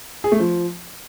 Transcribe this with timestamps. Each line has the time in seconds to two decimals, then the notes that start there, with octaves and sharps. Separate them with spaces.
0.24 G#4
0.32 A3
0.39 F3